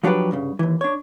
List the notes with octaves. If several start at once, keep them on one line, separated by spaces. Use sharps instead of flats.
F3 F#3 D4 G4 B4
C2 G2 C#3
D#2 E3
D4 C#5